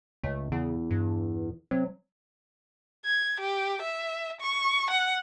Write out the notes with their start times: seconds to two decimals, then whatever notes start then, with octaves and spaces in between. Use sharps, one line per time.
0.23 C#2 A3
0.52 E2 C#3
0.90 G2
1.71 C3 F#3
3.06 G#6
3.41 G4
3.82 E5
4.41 C#6
4.90 F#5